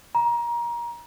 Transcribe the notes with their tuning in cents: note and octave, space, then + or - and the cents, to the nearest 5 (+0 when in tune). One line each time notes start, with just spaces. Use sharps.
A#5 +25